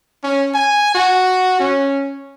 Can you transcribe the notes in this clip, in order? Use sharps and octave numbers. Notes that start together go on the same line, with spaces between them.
C#4
G#5
F#4
C#4